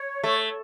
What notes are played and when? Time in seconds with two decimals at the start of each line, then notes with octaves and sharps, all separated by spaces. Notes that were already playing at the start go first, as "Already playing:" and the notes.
Already playing: C#5
0.24 A3